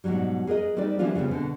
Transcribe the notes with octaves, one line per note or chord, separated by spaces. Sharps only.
G#2 B2 D#3 F#3 G3
G#4 A#4 B4 D#5
G3 C4 D#4 B4 D5
E3 F3 G3 B3 D4 F4
C#3 G3 B3 C4
B2 D3